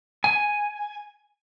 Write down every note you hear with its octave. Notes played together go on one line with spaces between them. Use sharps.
G#5